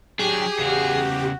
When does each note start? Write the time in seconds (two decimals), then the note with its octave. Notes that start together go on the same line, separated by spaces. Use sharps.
0.19 F#3 D4 G4 G#4
0.59 E2 C#3 F#4